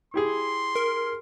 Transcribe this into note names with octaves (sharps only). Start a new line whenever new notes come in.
E4 G4 G#4 C6
A#4